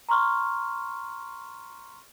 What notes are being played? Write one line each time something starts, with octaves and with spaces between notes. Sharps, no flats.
A#5 C6 C#6 F6